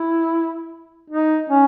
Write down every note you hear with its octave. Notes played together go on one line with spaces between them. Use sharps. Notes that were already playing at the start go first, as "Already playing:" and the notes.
Already playing: E4
D#4
C#4